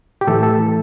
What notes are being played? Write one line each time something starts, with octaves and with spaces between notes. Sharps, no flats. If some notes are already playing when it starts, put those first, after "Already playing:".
G4
A2 E3 A3 A4
A4